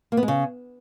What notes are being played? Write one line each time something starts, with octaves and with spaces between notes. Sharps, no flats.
A#3
B3
G#3
C#3